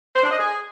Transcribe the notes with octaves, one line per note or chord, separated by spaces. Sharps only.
C5
D4
D#5
G#4